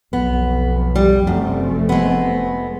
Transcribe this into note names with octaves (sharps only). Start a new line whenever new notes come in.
B1 F2 B3
G3
F1 F#2 A3 C4
G#3 B3